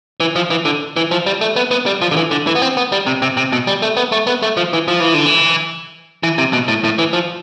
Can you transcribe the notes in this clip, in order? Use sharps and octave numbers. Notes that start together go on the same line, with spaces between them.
E3
F3
E3
D3
E3
F3
G3
A3
B3
B3
G3
F3
D3
E3
D3
E3
B3
C4
B3
G3
C3
C3
C3
B2
G3
A3
B3
A3
B3
A3
F3
E3
F3
E3
D3
E3
E3
C3
B2
A2
A2
E3
F3